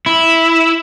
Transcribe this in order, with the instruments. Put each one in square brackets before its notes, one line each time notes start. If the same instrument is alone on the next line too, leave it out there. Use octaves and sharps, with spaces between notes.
[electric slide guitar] E4